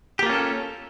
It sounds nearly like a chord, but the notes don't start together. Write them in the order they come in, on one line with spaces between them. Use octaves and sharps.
G4 A#3 F4 C#4 A4